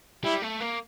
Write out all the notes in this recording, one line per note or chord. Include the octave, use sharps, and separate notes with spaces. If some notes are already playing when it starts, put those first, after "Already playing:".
G3 E4
A3
A#3